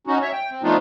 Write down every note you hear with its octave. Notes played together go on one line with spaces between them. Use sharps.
C#4 D#4 F#4
C#5 E5
G5
C4
F3 A3 B3 D4 D#4 F4